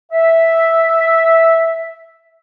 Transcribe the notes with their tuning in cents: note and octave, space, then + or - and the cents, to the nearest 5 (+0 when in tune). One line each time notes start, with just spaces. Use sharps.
E5 -5